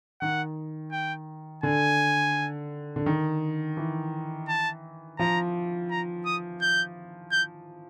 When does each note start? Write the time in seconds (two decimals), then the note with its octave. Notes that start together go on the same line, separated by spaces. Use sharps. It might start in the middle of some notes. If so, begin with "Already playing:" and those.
0.21 D#3 F#5
0.92 G5
1.63 D3 G#5
2.96 D3
3.06 D#3
3.77 E3
4.49 A5
5.18 F3 A#5
5.91 A#5
6.26 D#6
6.62 G6
7.32 G6